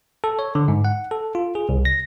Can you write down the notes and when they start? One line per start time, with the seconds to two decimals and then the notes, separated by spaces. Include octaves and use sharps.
0.24 A4
0.39 C#5
0.55 D3
0.68 G#2
0.85 F#5
1.11 A4
1.35 F4
1.55 G#4
1.69 C2
1.85 A#6